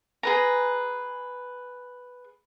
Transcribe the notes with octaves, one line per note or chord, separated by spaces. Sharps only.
G#4 B4 A#5